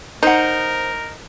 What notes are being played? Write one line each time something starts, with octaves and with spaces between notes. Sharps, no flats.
D#4 A#4 C5 F#5